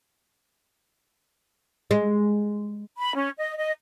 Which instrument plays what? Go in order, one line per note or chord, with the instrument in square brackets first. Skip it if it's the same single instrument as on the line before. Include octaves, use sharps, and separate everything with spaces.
[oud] G#3
[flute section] B5
C#4
D#5
D#5